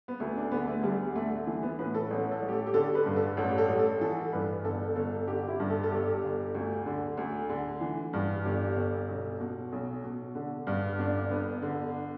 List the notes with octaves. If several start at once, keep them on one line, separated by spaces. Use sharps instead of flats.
B3
D2 A3
D4
D3 B3
A3
D2 G3
D3 A3
E3 A3
B3
A2 B4
A4
A1
A4
A1
G4
A4
G4
D3 A4
B4
G2
A4
A1 A4
G4
A4
A1
A4
E3 A4
G2 B4
G1 A4
G1 A4
D3 G4
E4
G2
A4
A4
G1 G4
G1
D2
D3
D2
D3
E3
G2
G1 G4
G1
B1
B2
B1
B2
D3
G2
G1 D4
G1 B3
D3